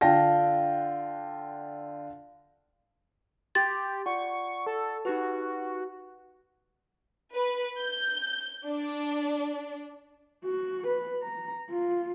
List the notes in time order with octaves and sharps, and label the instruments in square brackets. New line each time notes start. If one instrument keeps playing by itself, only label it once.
[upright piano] D3 D4 F4 G5 A5 A#6
[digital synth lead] G4 [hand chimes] C6 [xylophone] A6
[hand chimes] F4 D5 F#5 [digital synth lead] C#6
[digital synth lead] A4
[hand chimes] D#4 G4 B4 [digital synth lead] F#4
[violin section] B4
G6
D4
[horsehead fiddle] F#4
B4
A#5
F4